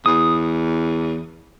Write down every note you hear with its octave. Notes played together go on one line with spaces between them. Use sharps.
E2 D#6